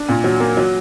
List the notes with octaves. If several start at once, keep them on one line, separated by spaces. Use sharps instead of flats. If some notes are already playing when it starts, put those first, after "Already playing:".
Already playing: D4
A#2
F#3
A#3
F#3